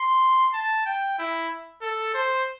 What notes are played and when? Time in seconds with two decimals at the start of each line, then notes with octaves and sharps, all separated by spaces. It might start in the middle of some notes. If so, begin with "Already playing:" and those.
Already playing: C6
0.54 A5
0.86 G5
1.19 E4
1.82 A4
2.14 C5